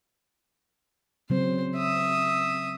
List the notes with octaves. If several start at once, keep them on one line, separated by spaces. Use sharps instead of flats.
C#3 F#3 C4 C5
E5 D#6